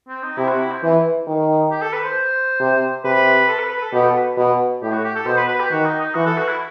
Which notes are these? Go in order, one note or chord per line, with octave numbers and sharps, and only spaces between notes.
C4
D#4
C3 E4
F#4
E4
C4
E3
D#3
G4
A4
B4
C5
C3
C3 B4
A4
B4
B4
A4
B2 G4
A4
B4
B2
A2 G4
F#4
G4
A4
B2 C5
B4
B4
G4
D#3 F#4
D#4
D#4
E3 F#4
A4
F#4
E4